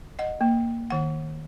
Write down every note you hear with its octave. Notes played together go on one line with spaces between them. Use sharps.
D#5 F#5
A#3
D#3 F#5